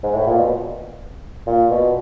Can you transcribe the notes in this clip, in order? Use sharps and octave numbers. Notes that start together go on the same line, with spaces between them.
G#2
A2
A#2
B2
A#2
B2